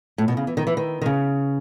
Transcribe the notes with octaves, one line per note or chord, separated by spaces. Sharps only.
A2
B2
C#3
E3
D#3
E3
D#3
D#3
C#3